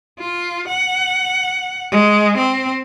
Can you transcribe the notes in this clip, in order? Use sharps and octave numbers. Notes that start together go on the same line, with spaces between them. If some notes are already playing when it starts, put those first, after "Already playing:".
F4
F#5
G#3
C4